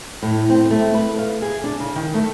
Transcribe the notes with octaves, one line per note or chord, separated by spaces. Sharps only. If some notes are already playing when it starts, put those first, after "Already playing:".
A2
C4
A3
B4
F5
G#4
D4
C#3
D#3
A3